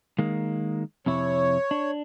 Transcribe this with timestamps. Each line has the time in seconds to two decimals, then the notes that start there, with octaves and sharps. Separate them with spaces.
0.18 D#3 G#3 A#3
1.06 F2 C3 E4 C#5
1.71 D4